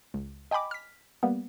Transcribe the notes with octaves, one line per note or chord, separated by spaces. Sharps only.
C#2
D#5 G5 G#5 B5 D6
F6 B6
G3 A#3 B3